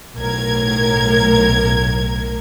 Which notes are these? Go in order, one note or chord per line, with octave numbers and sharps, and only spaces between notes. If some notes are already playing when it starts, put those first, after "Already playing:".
B1 A2 A#4 G#6